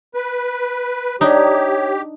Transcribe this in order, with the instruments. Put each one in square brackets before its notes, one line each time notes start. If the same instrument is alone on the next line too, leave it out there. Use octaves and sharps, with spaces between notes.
[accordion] B4
[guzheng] D4 D#4 [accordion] G4 [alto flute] C#5